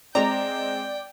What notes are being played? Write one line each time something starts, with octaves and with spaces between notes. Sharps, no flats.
G#3 C4 D5 G5 A#5